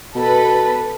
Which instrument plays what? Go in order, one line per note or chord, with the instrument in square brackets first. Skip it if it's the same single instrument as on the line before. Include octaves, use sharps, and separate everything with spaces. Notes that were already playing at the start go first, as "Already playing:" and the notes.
[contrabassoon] B2 [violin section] A4 B4